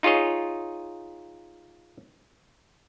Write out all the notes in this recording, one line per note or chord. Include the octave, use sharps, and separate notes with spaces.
D#4 F4 G#4 C#5 D#5